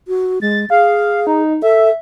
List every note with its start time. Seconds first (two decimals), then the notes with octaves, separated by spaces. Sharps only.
0.08 F#4
0.41 G#3 A6
0.70 G#4 F5
1.27 D#4
1.62 A4 E5